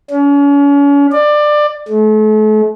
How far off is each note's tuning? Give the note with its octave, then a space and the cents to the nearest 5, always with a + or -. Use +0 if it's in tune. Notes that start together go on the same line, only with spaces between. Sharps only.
C#4 +40
D5 +20
A3 -40